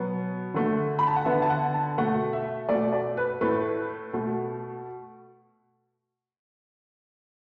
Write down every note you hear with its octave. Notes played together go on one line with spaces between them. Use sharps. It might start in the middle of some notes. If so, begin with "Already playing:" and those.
Already playing: B2 F#3 B3
D3 A3
B5
A5
F#5
D3 B3 E5
A5
F#5
A5
B2 A3 F#5
E5
B2 A3 D5
D5
B4
A2 A3 B4
B2 A3